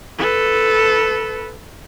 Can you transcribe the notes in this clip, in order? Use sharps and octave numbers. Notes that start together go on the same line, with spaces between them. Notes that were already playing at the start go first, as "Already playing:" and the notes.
A4 B4